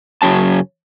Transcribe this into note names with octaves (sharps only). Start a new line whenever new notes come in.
F#2 C#3 F#3 C#4 A5